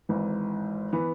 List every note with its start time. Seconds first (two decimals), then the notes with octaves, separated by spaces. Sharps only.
0.09 G#1 G#2 E3
0.93 E3 B3